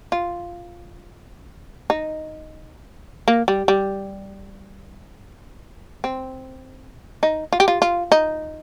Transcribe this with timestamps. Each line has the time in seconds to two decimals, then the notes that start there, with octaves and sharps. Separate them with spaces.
0.12 F4
1.90 D#4
3.28 A#3
3.48 G3
3.68 G3
6.04 C4
7.23 D#4
7.53 F4
7.60 G4
7.68 F4
7.82 F4
8.12 D#4